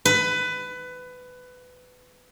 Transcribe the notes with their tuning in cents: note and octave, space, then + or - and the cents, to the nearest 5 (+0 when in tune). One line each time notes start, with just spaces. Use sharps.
B4 +20